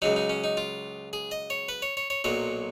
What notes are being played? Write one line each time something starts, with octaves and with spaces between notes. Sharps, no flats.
C#2 C#3 F#3 D#4
D#4
C#4
D#4
F4
G#4
D#5
C#5
B4
C#5
C#5
C#5
B1 A#2 F#3 C#5